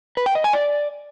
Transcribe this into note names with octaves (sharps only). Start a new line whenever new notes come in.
B4
G5
D#5
G#5
D5